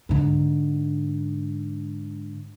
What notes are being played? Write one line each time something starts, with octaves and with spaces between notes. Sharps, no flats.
G#2 D3